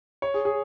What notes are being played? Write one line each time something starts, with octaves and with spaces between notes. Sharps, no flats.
C#5
G#4
G#4